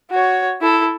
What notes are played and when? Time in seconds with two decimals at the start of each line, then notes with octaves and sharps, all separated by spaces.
0.10 F#4 C#5
0.61 E4 A4